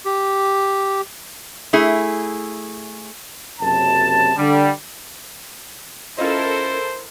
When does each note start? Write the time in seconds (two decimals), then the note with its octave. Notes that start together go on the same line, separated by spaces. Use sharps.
0.05 G4
1.73 A3 E4 G#4
3.61 F#1 F#2 C3 A5
4.37 D3 G3
6.18 C#4 E4 F4 A4 A#4 C5 D#5